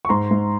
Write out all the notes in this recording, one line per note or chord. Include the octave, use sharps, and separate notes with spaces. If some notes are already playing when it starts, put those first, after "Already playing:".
C#6
G#2 A#5 C6
G#2